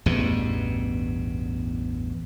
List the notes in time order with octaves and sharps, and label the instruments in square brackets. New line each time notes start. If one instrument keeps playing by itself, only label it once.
[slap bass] A1 E2 G2 B2